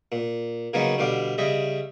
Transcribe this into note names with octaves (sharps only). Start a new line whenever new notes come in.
A#2
C#3 F#3 A#3 B3 C#4 D#4
B2 D3 G3 F5 D6
C#3 G3 D#5 E5